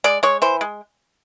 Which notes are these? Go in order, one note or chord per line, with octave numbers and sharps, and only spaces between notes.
G#3 D5
G#3 C#5
E3 C5
G#3